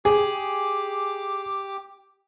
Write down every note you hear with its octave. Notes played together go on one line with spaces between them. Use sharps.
G4 G#4 D6